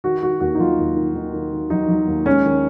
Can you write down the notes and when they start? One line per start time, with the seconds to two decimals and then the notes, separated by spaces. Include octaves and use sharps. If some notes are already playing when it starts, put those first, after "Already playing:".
0.04 D#3 F#4
0.23 D#3 F#4
0.40 D#2 F#4
0.55 D#4
0.59 F#3 F4
0.79 D#2
0.96 D#3
1.15 D#3
1.33 D#3
1.53 D#3
1.70 F#3 D#4
1.89 F#3
2.07 D#2
2.26 G#3 C#4
2.45 D#3